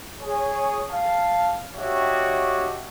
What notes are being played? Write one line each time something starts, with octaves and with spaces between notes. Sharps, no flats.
G#4 C#5
F5 A5
D4 F#4 G4 C#5 D#5 E5